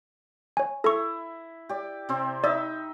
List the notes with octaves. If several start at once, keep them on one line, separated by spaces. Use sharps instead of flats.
C#5 G#5
E4 A4 C#6
G4 D5
C3 C4
D#4 D5 E5 B5